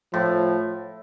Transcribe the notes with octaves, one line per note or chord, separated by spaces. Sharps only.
A2 F3